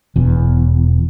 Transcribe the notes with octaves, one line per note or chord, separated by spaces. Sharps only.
E1 E2